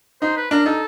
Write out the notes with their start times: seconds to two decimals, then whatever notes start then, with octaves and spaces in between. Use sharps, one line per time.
0.22 D#4 C5
0.37 B4
0.51 D4 A#4
0.66 D#4 A4